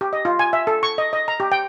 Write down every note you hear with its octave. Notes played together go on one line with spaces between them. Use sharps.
G4
D#5
F4
G#5
E5
A4
C#6
D#5
D#5
A#5
G4
G5